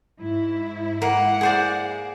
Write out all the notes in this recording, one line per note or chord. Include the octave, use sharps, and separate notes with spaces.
G#2 E4
A#3 F#5
G#4 C5 D5